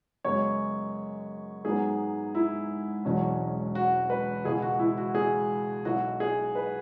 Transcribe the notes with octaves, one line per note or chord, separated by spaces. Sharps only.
F#2 C#3 G#3 B3 C#5
G#2 F#3 B3 G#4
E4
E1 E2 B2 F#3 C#4
F#4
B4
C#2 B2 B3 E4 G#4
F#4
F#4
E4
F#4
G#4
B1 B2 F#3 E4 F#4
G#4
B4